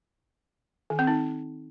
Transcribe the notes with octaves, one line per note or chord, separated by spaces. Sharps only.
D#3
C4
D#4